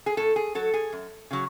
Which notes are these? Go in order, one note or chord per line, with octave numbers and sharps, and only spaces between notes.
G#4
A2 A4
G#4
F#3 A4
G#4
F#2
C#3 F#3